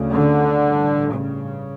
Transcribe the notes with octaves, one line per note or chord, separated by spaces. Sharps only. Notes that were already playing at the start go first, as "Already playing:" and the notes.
Already playing: D2 C#3
D3
A1 G2
C#3